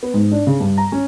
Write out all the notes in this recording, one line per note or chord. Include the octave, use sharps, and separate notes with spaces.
B3
G#2
D4
C#3
G2
A#5
C#4